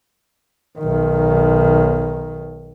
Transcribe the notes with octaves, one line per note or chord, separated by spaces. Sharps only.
B1 D#3